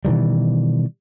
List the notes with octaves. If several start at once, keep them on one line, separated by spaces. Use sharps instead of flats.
B2 D#3 E3 G3